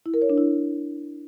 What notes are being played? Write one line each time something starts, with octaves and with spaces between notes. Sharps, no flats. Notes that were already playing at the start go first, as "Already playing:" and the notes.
E4
A#4
C#5
D4
E4